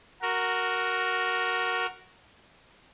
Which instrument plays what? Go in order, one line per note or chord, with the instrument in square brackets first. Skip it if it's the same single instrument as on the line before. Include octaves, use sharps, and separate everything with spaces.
[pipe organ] F#4 A#4